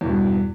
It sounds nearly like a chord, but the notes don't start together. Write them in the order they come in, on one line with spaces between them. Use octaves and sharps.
E2 B2 G2